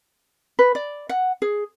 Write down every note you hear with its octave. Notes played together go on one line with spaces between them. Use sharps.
B4
D5
F#5
G#4